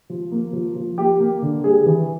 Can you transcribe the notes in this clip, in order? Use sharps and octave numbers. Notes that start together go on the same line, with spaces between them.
F3
A#3
F3
F3
A#3 G4
A#3
D3
G3 G#4
E3